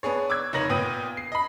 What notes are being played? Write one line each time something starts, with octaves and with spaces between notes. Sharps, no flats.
B3 D4 G#4 C#5
D6 E6 F#6 G#6
F1 D#4 A#4 C#5 A#6 F#7
A#2 B3 G5 D#6 D#7
C7
D#5 B5